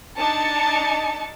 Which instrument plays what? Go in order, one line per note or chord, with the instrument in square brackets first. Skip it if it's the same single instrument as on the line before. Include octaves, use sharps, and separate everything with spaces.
[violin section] D4 D#4 A5 C#7